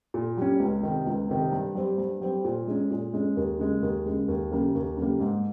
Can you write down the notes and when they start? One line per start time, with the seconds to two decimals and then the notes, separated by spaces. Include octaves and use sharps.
0.14 A#2
0.37 G3 C#4
0.60 C#2
0.83 C3 D#3
1.07 C#2
1.29 C3 D#3
1.53 G2
1.75 G3 C4
1.98 G2
2.21 G3 C4
2.45 A#2
2.68 G#3 C#4
2.91 A#2
3.14 G#3 C#4
3.37 D#2
3.59 C#3 G#3
3.82 D#2
4.06 C#3 G#3
4.28 D#2
4.52 C#3 G3 A#3
4.75 D#2
4.97 C#3 G3 A#3
5.20 G#2